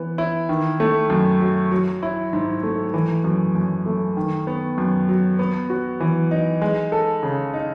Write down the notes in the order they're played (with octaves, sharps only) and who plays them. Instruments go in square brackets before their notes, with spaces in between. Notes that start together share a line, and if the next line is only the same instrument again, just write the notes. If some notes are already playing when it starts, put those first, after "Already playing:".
Already playing: [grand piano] E3 B3
E4
D#3
A3
F#2
F#3
F#3
E4
G#2
A3
E3
F#2
F#2
A3
D#3
B3
F#2
F#3
B3
F#4
E3
D#4
G#3
A4
C#3
D#4